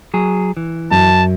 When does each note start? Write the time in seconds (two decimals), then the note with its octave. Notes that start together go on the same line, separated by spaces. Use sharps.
0.14 F#3 G#4
0.57 E3
0.91 F#2 A5